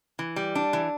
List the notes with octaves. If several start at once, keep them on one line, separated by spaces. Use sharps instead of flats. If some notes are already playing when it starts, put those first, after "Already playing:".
E3
G3
D4
E3